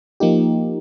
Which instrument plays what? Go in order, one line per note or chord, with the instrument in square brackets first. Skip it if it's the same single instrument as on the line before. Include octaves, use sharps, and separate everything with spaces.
[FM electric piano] F3 A#3 D#4 G4